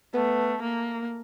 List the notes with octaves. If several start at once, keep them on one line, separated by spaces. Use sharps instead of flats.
A3 B3
A#3